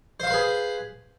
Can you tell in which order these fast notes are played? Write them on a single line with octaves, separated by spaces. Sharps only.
C5 F5 C6 B4 G#4